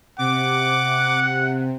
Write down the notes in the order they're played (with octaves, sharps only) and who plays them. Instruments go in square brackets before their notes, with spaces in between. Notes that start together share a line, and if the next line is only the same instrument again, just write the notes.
[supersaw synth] C3 [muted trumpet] F#5 [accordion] D6